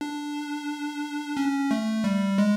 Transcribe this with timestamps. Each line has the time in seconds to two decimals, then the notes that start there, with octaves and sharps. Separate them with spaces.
0.01 D4
1.37 C#4
1.71 A3
2.04 G3
2.38 G#3